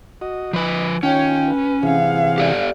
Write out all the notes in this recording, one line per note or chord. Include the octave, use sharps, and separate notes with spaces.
F#4 D#5
F3 B4 D#5 B5
D#3 C#4 F4 C#5 G5
B4
C3 E3 G#4 F5 F#5
G4 A4 D5